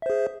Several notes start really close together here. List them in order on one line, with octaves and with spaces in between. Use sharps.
E5 C5 G#4